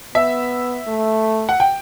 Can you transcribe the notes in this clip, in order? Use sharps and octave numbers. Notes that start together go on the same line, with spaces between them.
B3 E5
A3
F#5
G5